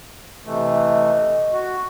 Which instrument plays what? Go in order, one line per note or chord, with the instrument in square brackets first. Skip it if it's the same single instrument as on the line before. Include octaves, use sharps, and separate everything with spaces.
[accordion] C3 E3 A3 [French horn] D#5
[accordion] F#4